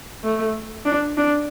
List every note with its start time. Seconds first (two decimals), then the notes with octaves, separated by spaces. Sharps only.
0.24 A3
0.86 D4
1.17 D4